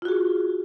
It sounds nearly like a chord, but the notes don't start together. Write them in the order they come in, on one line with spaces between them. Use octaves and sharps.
F4 F#4 G#4